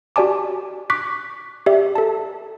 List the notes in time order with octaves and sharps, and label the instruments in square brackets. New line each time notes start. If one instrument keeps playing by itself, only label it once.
[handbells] F#4 G4 D5 G#5 A5 D6
C#6 D6 F#6 B6
G4 D5 E5
A4 A5